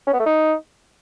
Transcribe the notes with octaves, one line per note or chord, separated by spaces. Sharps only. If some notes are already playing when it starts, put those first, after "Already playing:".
C#4
B3
A3
D#4